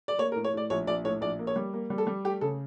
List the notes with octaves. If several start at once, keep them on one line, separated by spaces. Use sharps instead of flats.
D5
A#3 C#5
A#4
A2
C#5
A2 D5
A#1 C#5
A#1 D5
A2 C#5
A#1 D5
A#3
C#5
G3
A#3
G3
A4
G3
A3 G4
C#3 A4